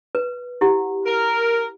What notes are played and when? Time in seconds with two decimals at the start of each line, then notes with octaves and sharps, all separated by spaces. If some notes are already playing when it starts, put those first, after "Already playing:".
0.15 B4
0.61 E4 G4 F#5
1.05 A#4